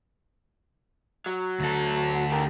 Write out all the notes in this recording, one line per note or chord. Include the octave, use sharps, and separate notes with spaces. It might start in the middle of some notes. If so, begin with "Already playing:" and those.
F#3
D2 A4
G4 A#4